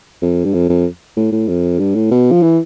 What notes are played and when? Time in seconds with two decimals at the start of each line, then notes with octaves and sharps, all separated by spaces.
0.22 F2
0.45 G2
0.54 F2
0.69 F2
1.17 A2
1.32 A2
1.48 F2
1.79 G2
1.95 A2
2.11 B2
2.31 F3
2.42 E3